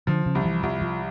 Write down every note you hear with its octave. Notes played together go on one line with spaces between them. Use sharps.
D3 F3
C#3
C2
E3
C2 F3
F3